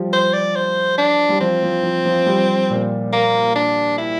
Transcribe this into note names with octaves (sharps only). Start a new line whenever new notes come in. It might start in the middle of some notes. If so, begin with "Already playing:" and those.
Already playing: F3 G3
C5
D5
C5
D4
G3
F3 C4
F3
F3
F3
G3
A#2
A#3
D4
E4